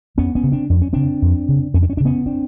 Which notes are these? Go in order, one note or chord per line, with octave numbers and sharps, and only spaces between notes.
F2 B3 C#4
B3 C#4
C#3
C4 D4
F2 D4
C#4
C#3 C4 D4
F2
C#3
F2 C#4
D4
C#4
C#3 D4
B3 C#4
C4 D4